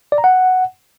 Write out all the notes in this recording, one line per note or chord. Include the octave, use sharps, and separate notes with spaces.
D5
A#5
F#5